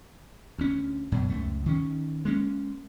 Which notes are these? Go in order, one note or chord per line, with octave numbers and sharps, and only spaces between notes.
D2 C#4
F#2 B2
C#2 F#2 A3
D#3 C#4
G#3 A#3 C#4